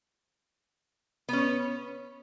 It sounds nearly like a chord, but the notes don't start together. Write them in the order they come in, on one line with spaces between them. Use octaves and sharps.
B3 C#4 C#5